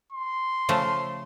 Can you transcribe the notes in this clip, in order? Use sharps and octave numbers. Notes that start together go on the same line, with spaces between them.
C6
C#3 F3 A3